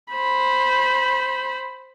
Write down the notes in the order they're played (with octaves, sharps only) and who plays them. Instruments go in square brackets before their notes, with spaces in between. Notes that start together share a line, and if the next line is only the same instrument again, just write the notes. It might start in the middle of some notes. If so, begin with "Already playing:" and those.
[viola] C5 B5